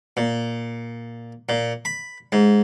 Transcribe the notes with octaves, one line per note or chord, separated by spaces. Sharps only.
A#2
A#2
B5
G#2